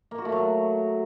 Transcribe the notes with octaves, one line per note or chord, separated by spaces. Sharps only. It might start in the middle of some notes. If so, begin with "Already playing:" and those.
A#3
F#4
A3
F#3